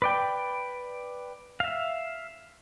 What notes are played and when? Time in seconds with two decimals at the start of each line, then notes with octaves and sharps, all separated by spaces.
0.02 B4 D5 G5
1.60 E5 F5